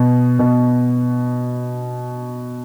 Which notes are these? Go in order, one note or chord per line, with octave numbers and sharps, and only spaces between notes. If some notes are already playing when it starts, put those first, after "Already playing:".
Already playing: B2
B2